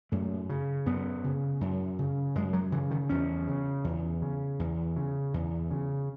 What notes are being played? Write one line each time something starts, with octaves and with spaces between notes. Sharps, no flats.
F#2 A3
C#3
F#2 B3
C#3
F#2
C#3
F#2 G#3
F#3
C#3 E3
D#3
E2 C#4
C#3
E2
C#3
E2
C#3
E2
C#3